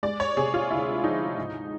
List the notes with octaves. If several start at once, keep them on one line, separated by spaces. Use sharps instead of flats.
G#3 D5
C#5
C3 G#4
F4
D2 E4
F3 D#4
G#2